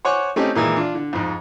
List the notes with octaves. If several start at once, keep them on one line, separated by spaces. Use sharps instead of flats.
C5 C#5 F#5 G#5 C#6 D6
A3 C4 C#4 D#4 G4
A#2 D#3 E3 G#3
D4 F4
D3
F2 G#2